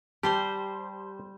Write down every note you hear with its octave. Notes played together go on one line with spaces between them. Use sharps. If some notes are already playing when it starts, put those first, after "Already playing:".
G3 G4 C5 A5 G7